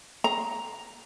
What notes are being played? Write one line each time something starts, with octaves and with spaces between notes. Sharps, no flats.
A#5